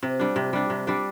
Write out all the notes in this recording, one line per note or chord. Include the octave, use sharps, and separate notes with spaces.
C3
G3 D4
C3
G3 D4
C3
G3 D4